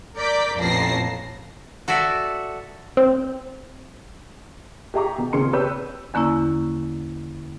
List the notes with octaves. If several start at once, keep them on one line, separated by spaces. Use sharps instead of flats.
A#4 D5 A#5 D6 G6 B6
A1 F2 A#2 A5 A#6 C7
F#4 A4 D5 E5
C4
G4 G#4 E5 A#5 C#6 D6
B2
A#1 C#3 C4 G#4 C6 C#7
G4 B4 C#5 D5 E6 G6
E2 D3 A#3 C#4 E4